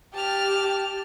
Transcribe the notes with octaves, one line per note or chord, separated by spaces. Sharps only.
G4 A5 F6